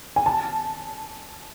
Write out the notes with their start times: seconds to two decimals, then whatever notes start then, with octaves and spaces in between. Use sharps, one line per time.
0.16 G#5
0.26 A5